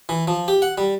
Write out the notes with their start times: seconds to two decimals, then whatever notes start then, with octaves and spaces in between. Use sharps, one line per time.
0.09 E3
0.28 F3
0.48 G4
0.62 F#5
0.78 G3